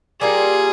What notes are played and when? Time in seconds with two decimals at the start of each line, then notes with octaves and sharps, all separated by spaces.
0.21 G3 A#3 F4 G#4